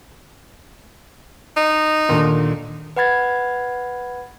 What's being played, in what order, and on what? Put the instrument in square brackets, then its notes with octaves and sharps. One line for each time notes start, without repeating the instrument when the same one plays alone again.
[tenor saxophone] D#4
[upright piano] D#2 A#2 D3
[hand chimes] B4 F#5 B5 G#6 A6